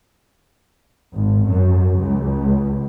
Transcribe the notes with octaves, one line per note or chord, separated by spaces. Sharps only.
G#1
F#2
C#2